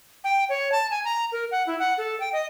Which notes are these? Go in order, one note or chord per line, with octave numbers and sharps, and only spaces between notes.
G5
C#5
A5
G#5
A#5
A#4
F#5
E4
F#5
A4
G5
D#5